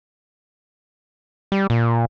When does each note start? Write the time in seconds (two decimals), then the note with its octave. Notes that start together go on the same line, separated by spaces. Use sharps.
1.52 G3
1.70 A#2